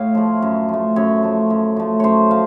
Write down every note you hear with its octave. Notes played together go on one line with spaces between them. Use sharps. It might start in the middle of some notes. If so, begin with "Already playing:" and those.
Already playing: A2 C#5 F5
F3 A3
F#2
F3 A3
F#2 C#5
F3 A3
F#2
F3 A3
F#2 C5 C#5
F3 F5